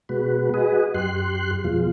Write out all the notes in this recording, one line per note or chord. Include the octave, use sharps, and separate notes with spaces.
B2 G#3 F#4 B4
F#4 G#4 B4 D#5
F#2 G4 C6 F#6
F2 B2 F3 G#3 F4